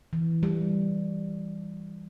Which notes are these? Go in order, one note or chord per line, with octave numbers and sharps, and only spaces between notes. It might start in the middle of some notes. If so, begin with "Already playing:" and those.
E3
G3